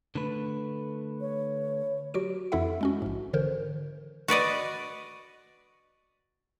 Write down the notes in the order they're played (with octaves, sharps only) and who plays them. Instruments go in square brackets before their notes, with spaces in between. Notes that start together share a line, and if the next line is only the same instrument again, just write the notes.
[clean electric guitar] D3 A3 B4
[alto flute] C#5
[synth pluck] F#3 F#4 G4 D7
F2 E3 E4 A4 E5 F#5
G#3 C#4 F#4
A#1 G#2
D3 E3 A#4 C5
[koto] F#4 B4 D5 D#5